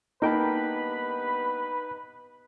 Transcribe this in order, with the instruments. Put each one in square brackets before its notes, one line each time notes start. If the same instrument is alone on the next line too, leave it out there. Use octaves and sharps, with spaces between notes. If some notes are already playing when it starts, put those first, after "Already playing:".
[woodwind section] G2 B3 B5 [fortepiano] A#3 G5 A5 [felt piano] D#4 [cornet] B4